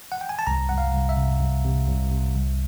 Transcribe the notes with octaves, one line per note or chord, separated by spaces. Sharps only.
F#5
G5
G#5
A5
C2 A#5
C2 F#5
F5
C2
E5
C3
C2
C3
C2
C3
C2